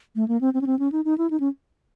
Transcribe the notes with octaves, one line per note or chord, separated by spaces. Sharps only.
A3
A#3
C4
C4
C#4
C4
C#4
D#4
D#4
E4
D#4
C#4